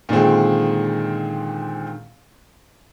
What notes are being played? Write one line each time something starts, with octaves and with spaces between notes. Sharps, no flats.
A#2 D3 D#3 G#3 C4